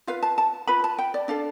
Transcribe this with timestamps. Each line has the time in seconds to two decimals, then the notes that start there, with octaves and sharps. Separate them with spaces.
0.07 F4 B4 F5
0.22 A5
0.38 A5
0.67 F4 B4 B5
0.84 A5
0.98 G5
1.14 D5
1.28 D4 A4 F5